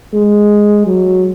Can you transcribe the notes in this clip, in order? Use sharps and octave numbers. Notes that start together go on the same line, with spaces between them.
G#3
F#3